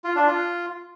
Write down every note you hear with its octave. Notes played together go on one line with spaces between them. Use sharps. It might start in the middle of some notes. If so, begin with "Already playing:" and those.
F4
D4
F4